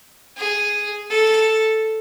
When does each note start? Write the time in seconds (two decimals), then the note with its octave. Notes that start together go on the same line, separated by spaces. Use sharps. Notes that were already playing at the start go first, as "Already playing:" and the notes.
0.37 G#4
1.10 A4